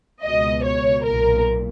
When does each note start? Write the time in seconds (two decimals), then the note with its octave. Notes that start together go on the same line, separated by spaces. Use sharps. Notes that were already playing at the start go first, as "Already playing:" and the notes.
0.23 C#2 B2 D#5
0.63 C#5
1.05 B1 A#2 A#4